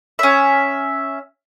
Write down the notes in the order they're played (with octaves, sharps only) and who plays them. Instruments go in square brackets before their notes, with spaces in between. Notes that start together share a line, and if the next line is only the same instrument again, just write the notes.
[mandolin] C#4 E5